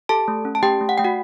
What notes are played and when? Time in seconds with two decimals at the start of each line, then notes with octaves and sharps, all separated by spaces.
0.09 G4 A4 A5
0.28 A3
0.45 C#4
0.55 A5
0.63 A3 G4 G5
0.81 A3
0.89 F#5
0.98 A3 G5
1.04 F#4 F#5